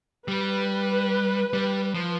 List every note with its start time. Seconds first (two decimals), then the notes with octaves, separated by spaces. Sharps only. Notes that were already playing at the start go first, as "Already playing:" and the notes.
0.28 G3 B4
1.53 G3
1.94 F3